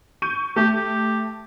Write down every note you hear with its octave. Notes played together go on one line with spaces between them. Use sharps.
C#6 G6 D#7
A3 G4
G4